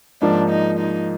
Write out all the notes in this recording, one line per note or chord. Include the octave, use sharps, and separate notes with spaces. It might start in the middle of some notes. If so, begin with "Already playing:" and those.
G#2 F3 A#3 D4
D#4
D#4